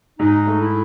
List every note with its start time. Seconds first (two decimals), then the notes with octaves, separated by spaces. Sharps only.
0.19 G#2 D#4
0.47 A3
0.60 E4